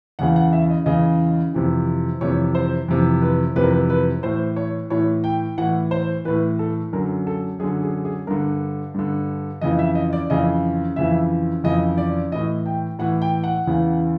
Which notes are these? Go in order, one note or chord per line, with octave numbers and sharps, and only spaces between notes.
E2 C#3 E3 F#5
F#5
E5
D#5
E2 C#3 E3 D#5
F2 C3 E3
F2 C3 E3 C#5
C5
F2 C3 E3
B4
F2 C3 E3 B4
A#4
B4
B4
A2 E3 C5
C#5
A2 E3 C#5
G5
A2 E3 F#5
C5
A2 E3 B4
A4
F#2 D3 A#4
A4
F#2 D3 G#4
G#4
G#4
G2 D3 A#4
G2 D3
F2 C#3 E3 D#5
E5
D#5
D5
F2 C#3 E3 D#5
F2 C#3 E3 E5
F2 C#3 E3 D#5
D5
A2 E3 D#5
G5
A2 E3 F#5
G5
F#5
E2 C#3 E3